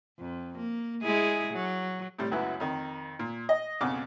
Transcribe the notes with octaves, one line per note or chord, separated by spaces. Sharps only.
F2
A#3
G#3 E4 G#4
F#3
A2 C3 G3
C#2 F#2 F#3 B3 E4 F#4
F2 D#3
A#2
D#5
B1 F2 C#3 F#5 D6 F6